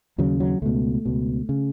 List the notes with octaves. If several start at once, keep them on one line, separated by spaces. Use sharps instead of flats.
D#2 C#3 F#3
F#3
C#2 B2 A3
C#2 B2
C#3